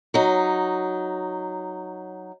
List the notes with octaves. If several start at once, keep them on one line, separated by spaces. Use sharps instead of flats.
F#3 D#4